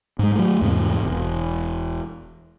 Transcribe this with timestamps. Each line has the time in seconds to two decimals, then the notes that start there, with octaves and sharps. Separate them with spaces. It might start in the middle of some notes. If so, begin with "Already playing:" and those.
0.19 G#2 G#3
0.35 F#3 A3
0.61 E2 G#2 C3 C4
1.03 E1